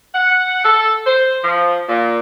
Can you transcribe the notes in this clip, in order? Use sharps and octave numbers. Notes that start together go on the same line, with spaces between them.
F#5
A4
C5
F3
A#2